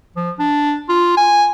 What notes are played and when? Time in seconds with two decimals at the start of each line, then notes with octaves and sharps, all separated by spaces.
0.16 F3
0.39 D4
0.89 F4
1.17 G#5